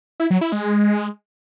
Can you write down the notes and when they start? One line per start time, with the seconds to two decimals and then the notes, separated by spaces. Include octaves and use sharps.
0.20 E4
0.30 F#3
0.41 E4
0.52 G#3